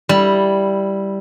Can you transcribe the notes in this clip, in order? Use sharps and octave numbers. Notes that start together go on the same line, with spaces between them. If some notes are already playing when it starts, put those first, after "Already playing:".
G3 E4